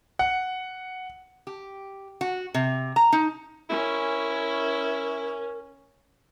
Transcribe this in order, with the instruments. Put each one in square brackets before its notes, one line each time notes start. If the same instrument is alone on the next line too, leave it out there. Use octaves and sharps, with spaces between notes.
[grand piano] F#5
[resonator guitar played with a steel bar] G4
F#4
C3
A#5
D#4
[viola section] C#4 [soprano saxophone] E4 [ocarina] A#4